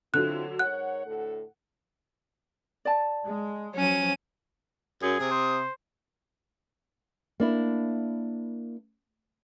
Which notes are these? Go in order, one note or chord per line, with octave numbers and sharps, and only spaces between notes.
D3 F#3 C4 E4 F4 F#6
G#2 A#4 C#5 F#5 F#6
D2 A2 A4
D5 A5
G#3
F3 F#3 C#4 D#7
F#2 G#4
C3 D#6
C5
A#3 D4 E4